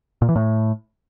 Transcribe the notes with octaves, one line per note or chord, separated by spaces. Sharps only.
A#2
E3
A2